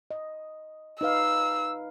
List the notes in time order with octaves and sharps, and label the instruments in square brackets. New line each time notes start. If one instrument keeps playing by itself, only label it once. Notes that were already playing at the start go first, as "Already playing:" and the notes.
[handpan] D#5
[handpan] D#4 B4 F5 [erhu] E6